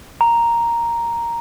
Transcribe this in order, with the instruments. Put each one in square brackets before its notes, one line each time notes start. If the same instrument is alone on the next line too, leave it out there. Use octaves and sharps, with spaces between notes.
[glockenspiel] A#5